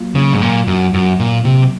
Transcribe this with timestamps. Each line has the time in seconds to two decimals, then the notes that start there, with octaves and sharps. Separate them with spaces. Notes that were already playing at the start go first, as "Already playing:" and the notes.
Already playing: F#3 A#3 F4
0.15 C#3
0.33 G#2
0.42 A#2
0.67 F#2
0.94 F#2
1.20 A#2
1.45 C3